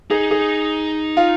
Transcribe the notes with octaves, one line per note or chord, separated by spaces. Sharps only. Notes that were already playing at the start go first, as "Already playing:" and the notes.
D#4 G#4
G#4
F4